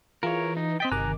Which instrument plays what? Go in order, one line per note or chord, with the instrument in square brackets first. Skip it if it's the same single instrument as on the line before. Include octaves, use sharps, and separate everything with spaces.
[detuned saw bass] E3 [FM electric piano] F4 G#4 [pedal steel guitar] A#4 C#5
[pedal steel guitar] D#4
[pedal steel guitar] C4 D#5 G5 [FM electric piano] A6 B6
[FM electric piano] G1 C3 D6 [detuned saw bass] D#3 [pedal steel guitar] G#5 A#5 F#6